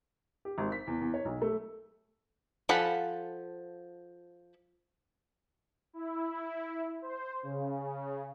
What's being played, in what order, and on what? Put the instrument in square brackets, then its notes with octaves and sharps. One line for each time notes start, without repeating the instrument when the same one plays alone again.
[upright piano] G4
G#1
B6
E2
E2
C#5
B1
A3
[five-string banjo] F3 A4 F#5 G#5 B5
[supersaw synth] E4
C5
C#3